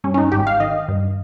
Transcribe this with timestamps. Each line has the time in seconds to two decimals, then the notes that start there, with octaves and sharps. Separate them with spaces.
0.04 G2 C#4
0.14 C#4
0.18 D#4
0.32 G#1 G4
0.47 F5
0.60 D#3 D#5
0.88 G2